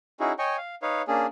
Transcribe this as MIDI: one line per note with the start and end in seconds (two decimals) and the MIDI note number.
0.20 0.33 61
0.20 0.33 63
0.20 0.33 64
0.20 0.33 66
0.20 0.33 68
0.39 0.57 73
0.39 0.57 75
0.39 0.57 79
0.39 0.57 80
0.39 0.57 85
0.58 0.75 77
0.82 1.02 63
0.82 1.02 71
0.82 1.02 73
0.82 1.02 77
1.08 1.26 58
1.08 1.26 61
1.08 1.26 62
1.08 1.26 68